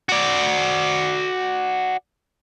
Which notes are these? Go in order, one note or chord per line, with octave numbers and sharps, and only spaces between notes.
F#4 D5